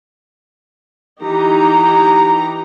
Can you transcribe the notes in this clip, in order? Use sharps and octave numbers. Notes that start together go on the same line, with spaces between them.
E3 D#4 G4 A#5